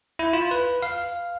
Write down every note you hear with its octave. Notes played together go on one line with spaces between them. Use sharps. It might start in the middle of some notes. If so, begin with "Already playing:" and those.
E4
F4
B4
F5